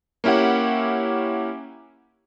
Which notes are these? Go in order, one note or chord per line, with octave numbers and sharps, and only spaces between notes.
A#3 C#4 E4 G4 F#5